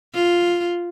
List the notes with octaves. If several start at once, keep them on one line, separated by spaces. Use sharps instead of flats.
F4